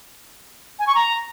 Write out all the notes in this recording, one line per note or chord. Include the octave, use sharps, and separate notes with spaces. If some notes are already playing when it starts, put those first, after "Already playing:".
G#5
C#6
A#5